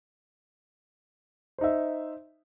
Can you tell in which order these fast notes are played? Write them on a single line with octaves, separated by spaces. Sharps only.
C5 D#4 E5